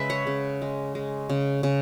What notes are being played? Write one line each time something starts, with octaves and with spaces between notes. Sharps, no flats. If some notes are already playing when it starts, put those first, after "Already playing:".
Already playing: C#3 G#3 B4 E5
C#5 F#5
C#3
G#3
G#3
C#3
C#3